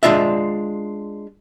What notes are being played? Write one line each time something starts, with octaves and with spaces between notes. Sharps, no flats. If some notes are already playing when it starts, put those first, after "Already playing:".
G#3 D4 F4 D5 E5